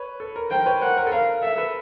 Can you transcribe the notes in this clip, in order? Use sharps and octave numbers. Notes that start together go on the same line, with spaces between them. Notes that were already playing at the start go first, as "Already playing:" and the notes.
Already playing: B4 C#5
A4
A#4
A#4 C5 G5
B4 C#5
A#4 C5 F#5
A#4
A4
A#4 F5
A4 E5
A4 B4